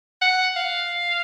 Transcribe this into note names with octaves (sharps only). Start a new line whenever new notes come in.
F#5
F5